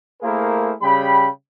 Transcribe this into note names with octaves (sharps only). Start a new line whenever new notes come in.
A3 A#3 E4 G#4 A#4 C5
C#3 G3 G5 B5